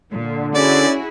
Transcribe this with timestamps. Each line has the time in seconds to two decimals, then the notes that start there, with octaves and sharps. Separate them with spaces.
0.12 A#2 D3
0.55 C#4 E4 F#4 G#4 D5